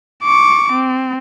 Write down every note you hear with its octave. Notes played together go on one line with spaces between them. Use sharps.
C#6 D6
C4